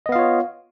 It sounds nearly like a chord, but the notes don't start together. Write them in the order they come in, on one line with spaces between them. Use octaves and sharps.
D#5 B3 F5 F4 C#5